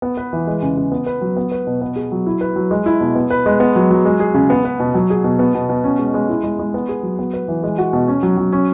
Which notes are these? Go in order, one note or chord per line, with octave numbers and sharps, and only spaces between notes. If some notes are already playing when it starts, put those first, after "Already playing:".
B3
B4
E3
G#3
C#3
C#3
B3
B4
F#3
B3
B4
B2
B3
G#4
F#3
E4
B4
F#3
G#3
E4
B2
B3
B4
G#3
B3
F#3
F#3
G#3
G#4
C#3
B3
B4
B2
F#3
G#4
B2
B3
B2
B2
C#4
G#3
G#3
E4
G#3
G#3
B3
G#4
F#3
B3
B4
E3
G#3
F#4
B2
C#4
F#3
F#3
C#4